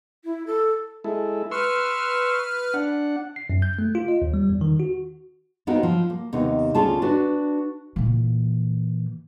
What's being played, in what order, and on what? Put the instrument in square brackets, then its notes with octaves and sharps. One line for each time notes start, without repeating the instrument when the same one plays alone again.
[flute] E4
A4
[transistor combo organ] G#3 E4 A4
[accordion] B4 F6 [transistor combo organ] C6 C#6 E6
[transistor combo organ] D4 F#5
[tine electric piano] C7
F#2
G6
A3
F4
D#5
D#2
G3
E2
D#3
F#4
[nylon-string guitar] B3 C4 D#4 F4 F#4 A#4
F3
A#3
D#2 C3 B3 D#4
D2 C#4 F4 G#4 A5
D4 F#4 B4
[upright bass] A#2 E3